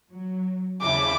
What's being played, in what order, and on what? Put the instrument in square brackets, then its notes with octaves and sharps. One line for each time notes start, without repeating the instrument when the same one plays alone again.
[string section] F#3
[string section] D#2 C#3 E4 [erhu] D6